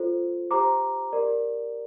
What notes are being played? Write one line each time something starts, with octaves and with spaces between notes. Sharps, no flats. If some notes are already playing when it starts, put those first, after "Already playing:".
Already playing: F4 A4 C5
G4 C5 A#5 D6
G4 A#4 D5